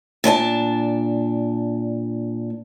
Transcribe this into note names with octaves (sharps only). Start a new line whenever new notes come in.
A#2 D4 G#5 A5